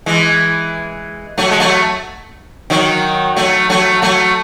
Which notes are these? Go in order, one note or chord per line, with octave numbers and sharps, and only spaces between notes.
E3 G#3
F#3 A3
G#3
F#3 A3
D#3 F#3
F#3 A3
F#3 A3
F#3 A3